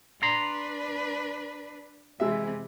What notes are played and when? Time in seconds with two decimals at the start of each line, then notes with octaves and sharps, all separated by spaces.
0.23 D4 B4 A#5 C6
2.20 C3 E3 G#3 E5